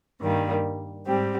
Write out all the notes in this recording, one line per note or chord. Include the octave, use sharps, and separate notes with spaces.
G2 D#3 G3 A#3
G#2 G3 C4 G4